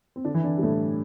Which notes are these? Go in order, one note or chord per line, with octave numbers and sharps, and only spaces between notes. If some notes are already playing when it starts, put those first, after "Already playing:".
C4
D3 D4
E3 E4
D3 D4
G3
A2 A3